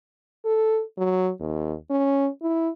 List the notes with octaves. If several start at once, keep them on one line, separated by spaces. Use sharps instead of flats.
A4
F#3
D#2
C#4
E4